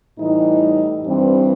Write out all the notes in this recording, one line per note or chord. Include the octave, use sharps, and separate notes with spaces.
A2 E3 G3 D#4
G2 E3 G3 C4